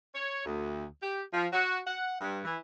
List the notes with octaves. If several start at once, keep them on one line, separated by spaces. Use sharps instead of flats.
C#5
D2
G4
F3
F#4
F#5
G2
E3